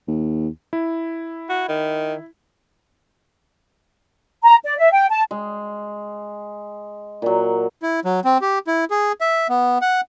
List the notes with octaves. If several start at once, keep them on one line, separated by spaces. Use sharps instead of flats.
D#2
E4
F#4
D#3
A#5
D5
E5
G5
A5
G#3
A#2 F#3
E4
F#3
C4
G4
E4
G#4
E5
B3
F#5